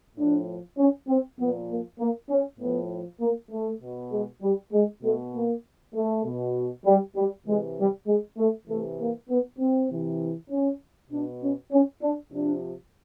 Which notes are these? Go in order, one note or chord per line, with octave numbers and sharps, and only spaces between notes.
A2 F3 D4
C#4
C4
A#2 F3 B3
A#3
A#3
C#4
A2 F3 B3
A#3
A3
B2
G#3
G3
G#3
B2 A3
A#3
A3
B2
G3
G3
C3 E3 G#3
G3
G#3
A3
C3 E3 A3
A#3
B3
C4
C3 E3
C#4
B2 D4
C#4
C#4
D4
C3 F3 D4